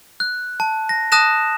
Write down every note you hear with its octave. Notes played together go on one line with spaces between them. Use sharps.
F#6
A5
A#6
A5 D#6 F#6 A#6 E7